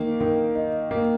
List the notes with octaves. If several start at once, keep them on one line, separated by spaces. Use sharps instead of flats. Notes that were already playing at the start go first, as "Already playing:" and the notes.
Already playing: D#3 A#3
D#3
D#4
A#3